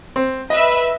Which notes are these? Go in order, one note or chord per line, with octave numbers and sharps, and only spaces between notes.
C4
B4 D#5 E5